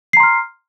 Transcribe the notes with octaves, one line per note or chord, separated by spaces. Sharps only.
A#5 C6 F6 C7